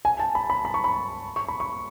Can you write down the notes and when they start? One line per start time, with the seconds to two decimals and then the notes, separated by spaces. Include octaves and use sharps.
0.05 G#5
0.20 A5
0.35 B5
0.50 B5
0.65 B5
0.74 C#6
0.84 B5
1.36 C#6
1.48 B5
1.60 C#6